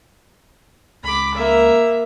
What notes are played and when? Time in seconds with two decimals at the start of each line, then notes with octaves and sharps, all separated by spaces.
1.03 C#2 B5 D6
1.34 A#3 E5